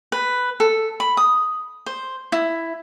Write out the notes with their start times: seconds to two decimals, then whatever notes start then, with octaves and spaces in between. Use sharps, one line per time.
0.12 B4
0.60 A4
1.00 B5
1.17 D#6
1.86 C5
2.32 E4